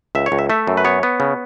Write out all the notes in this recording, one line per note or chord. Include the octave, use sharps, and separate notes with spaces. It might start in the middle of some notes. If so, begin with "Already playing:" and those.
C#2 E5
C#5
C#2
E5
A3 E5
F#2
B4
B3 C#5
B3
C#3